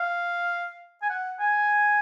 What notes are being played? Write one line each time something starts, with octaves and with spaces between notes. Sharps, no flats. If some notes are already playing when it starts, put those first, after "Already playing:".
Already playing: F5
G#5
F#5
G#5